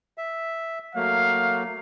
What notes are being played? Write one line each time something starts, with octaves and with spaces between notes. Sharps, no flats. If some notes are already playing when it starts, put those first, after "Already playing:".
E5
F#3 A3 A#3 F5